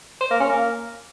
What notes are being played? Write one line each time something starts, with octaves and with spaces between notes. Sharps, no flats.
C5
A#3
C#4
A#3